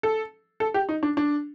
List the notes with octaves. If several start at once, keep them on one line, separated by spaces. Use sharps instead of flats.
A4
A4
G4
D#4
D4
D4